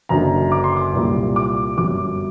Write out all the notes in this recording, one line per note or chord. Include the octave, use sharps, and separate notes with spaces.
F#1 F#2 D3 A#5
D6
C6
D6
C2 A#2 G3
D6
G1 F#2 F#3 D6